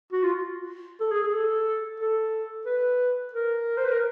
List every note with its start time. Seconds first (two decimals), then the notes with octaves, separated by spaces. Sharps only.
0.12 F#4
0.23 F4
1.00 A4
1.11 G#4
1.23 G#4
1.34 A4
2.00 A4
2.66 B4
3.33 A#4
3.77 C5
3.85 B4
3.92 A#4